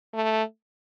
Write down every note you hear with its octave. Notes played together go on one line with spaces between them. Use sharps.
A3